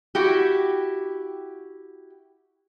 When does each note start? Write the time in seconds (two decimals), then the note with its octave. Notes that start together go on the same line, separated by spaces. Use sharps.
0.15 E4 F#4 G4